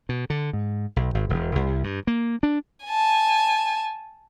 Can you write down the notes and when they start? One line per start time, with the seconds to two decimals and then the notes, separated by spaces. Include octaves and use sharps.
0.09 B2
0.30 D3
0.53 G#2
0.96 B1
1.14 G#1
1.29 E1
1.55 C2
1.84 G2
2.07 A#3
2.43 D4
2.85 G#5 A5